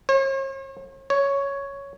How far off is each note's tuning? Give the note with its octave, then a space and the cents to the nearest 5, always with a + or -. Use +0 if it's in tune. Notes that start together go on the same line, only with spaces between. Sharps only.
C#5 -45
C#5 +5